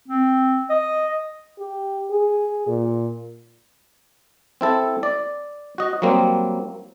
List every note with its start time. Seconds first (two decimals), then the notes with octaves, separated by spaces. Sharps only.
0.08 C4
0.70 D#5
1.59 G4
2.11 G#4
2.67 A#2
4.61 C4 E4 A4
5.03 D5
5.78 F#4 D#5
6.02 F#3 G3 A#3 C4